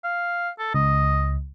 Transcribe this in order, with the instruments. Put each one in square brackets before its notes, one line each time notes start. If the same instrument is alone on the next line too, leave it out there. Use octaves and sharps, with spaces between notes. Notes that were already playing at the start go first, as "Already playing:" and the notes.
[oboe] F5
A4
[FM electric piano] C#2 [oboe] D#5